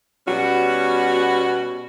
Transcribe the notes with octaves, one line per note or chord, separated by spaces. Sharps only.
B2 G3 C#4 F#4